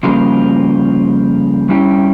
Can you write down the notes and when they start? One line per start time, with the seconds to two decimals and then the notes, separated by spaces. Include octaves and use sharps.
0.03 F2 C#3 G3 A#3 F4
1.69 G2 G3 C#4 E4 G4